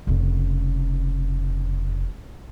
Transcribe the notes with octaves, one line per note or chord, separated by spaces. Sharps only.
F1 C#3